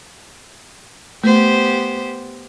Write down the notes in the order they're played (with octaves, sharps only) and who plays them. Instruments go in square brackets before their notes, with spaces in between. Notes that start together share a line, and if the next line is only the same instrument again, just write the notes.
[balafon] A3 [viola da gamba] B3 G4 C5